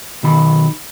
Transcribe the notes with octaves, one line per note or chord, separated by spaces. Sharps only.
B1 D#3 B5